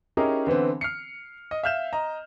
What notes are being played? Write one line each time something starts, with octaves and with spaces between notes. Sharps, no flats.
C#4 D#4 E4 G4 G#4 A#4
D3 E3 B3 C4
F6 C7 C#7
D#5
E5 F5 F6 G6 E7
D#5 A#5